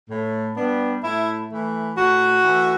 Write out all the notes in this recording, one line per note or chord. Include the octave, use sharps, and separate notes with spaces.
A2
G3 B3 D4
A2 E4
E3 A3
A2 F#4
E3 A3